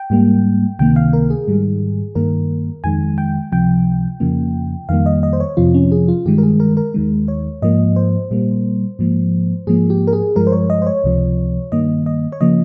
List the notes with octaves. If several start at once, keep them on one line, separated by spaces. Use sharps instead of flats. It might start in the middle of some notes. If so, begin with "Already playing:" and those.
Already playing: G5
G#2 G3 A#3
C#2 C3 D#3 A#3 G5
F5
A#4
G#4
G#2 D#3 G3
G2 D#3 A#3 A#4
F2 D#3 G#3 G#5
G5
C#2 C3 F3 G5
F2 C#3 F3 A#3
F2 D#3 G3 A#3 F5
D#5
D#5
C5
C#5
F2 C3 F3 F4
C#4
G#4
F4
G2 D#3 G#3 G4
A#4
G#4
A#4
A#4
D#2 D#3 G#3
C#5
G#2 F3 A#3 D#5
C5
A#2 G3 A#3
G#2 F3 A#3
G#2 F3 A#3 G#4
G4
A#4
G#4
G2 F3 G#3 A#4
C5
C#5
D#5
C5
C#5
C#2 C3 F3
G2 D#3 A#3 D#5
D#5
C#5
C#3 F3 A#3 D#5